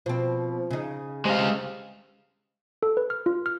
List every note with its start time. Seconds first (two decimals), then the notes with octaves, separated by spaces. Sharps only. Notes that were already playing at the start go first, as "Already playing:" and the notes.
0.06 B2 F3 C4
0.71 C#3 D#4
1.25 C3 G#3 F5
2.83 A4
2.97 B4
3.10 F6
3.26 F4
3.46 F6